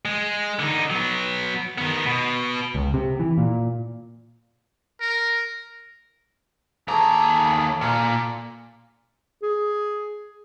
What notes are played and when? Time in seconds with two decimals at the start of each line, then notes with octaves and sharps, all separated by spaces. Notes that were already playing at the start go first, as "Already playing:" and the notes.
0.05 G#3
0.59 D3 D#4
0.90 F#3 B3
1.78 D#3 B3
2.06 B2
2.75 C#2
2.94 C3
3.20 E3
3.38 A#2
5.01 A#4
6.88 D#2 G#4 A4 A#5 C#6 D6
7.81 A#2 F5 A#5 C6
9.43 G#4